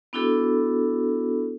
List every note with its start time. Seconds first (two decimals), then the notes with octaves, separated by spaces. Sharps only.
0.13 B3 D4 E4 F#4 A4